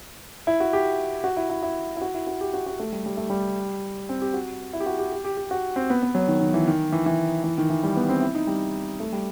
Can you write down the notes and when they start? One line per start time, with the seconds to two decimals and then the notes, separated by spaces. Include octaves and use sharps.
0.47 E4
0.60 F#4
0.73 G4
1.24 F#4
1.37 E4
1.50 E4
1.62 E4
1.97 E4
2.01 F#4
2.14 E4
2.27 F#4
2.41 G4
2.54 F#4
2.66 F#4
2.80 A3
2.92 G3
3.06 G3
3.17 A3
3.30 G3
4.09 C4
4.22 G4
4.34 F#4
4.73 E4
4.80 G4
4.86 F#4
4.99 G4
5.12 G4
5.25 G4
5.37 G4
5.51 F#4
5.76 C4
5.90 B3
6.03 B3
6.15 F#3
6.28 D#3
6.41 D#3
6.54 E3
6.67 D#3
6.92 E3
7.06 E3
7.44 E3
7.58 D#3
7.70 E3
7.83 G3
7.96 B3
8.09 C4
8.21 E4
8.35 D#4
8.47 G3
9.00 A3
9.13 G3